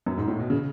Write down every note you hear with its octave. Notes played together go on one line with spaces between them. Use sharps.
F#2
G#2
A2
B2
C#3